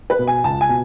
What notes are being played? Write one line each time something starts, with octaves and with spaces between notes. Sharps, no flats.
B4
B2
G#5
C#2 A5
G#5
B2